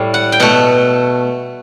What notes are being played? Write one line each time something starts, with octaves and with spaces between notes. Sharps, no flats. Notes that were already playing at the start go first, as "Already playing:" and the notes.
Already playing: A2 G3
F#5
G5
B2 A3 F#5